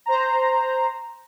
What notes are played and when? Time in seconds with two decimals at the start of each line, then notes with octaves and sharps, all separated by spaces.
0.06 C5 A#5